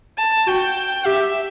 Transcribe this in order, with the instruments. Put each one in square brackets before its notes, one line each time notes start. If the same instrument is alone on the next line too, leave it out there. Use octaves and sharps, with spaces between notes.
[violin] A5
[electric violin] F#4 [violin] G5
[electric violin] G4 [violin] E5